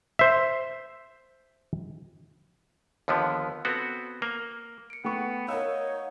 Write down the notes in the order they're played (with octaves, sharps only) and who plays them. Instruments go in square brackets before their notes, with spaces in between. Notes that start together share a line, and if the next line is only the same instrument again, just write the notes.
[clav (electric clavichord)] C5 E5
D#2 D3 F3 B3
B3 C4 F#4 A4
A#3
[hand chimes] C#7 D7
[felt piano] A3 C#6 [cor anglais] B3 [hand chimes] G5
[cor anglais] D#4 [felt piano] A#4 E6 [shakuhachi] C#5 [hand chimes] F5 F#5